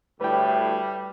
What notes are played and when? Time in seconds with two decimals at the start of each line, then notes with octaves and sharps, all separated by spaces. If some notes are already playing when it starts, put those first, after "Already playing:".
0.21 D2 A2 G3 B4 G5